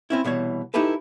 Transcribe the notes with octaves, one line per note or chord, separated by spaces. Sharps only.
C4 C#4 E4
C2 B2 E3 C#5
D#4 E4 G4 A4 B4